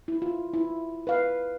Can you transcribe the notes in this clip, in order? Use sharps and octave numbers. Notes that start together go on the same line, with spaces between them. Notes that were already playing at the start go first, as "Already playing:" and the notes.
E4
F4
E4
B4 F5